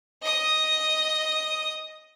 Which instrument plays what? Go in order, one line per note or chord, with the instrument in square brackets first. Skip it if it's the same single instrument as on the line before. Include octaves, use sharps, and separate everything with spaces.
[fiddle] D#5 D#6